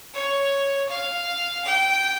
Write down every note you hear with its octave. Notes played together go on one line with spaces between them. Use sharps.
C#5
F5
G5